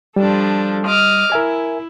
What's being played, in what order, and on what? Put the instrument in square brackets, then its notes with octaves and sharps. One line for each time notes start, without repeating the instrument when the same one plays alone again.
[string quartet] F3 D4 A4 [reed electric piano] G3
[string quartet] D#5 D6 F6
[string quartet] E4 [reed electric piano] A#4 E5 G#5